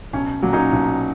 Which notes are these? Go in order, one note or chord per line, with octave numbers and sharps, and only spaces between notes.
B1 C#4
A#2 F#3
C#4 D#4
B1